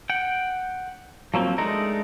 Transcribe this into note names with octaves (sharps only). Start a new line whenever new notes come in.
F#5 G5
F3 F#3 A#3 C4
G#3 A3 D4 D#4 A#4